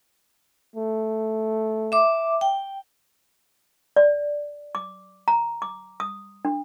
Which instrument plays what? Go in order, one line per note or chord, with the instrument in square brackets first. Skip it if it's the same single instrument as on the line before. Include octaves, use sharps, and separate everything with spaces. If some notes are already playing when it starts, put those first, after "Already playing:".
[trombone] A3
[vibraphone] E5 D6
G5
[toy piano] D5
D6
A#5
D6
D#6
D4